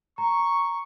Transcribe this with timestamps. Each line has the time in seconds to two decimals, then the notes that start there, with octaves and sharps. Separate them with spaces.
0.18 A#5 C#6